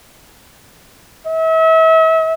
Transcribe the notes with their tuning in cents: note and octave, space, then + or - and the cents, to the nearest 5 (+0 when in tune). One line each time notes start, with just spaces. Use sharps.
E5 -40